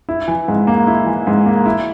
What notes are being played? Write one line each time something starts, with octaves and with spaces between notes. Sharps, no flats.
E4
E3
G#2
A#3
E4
E3
G#2
A#3
E4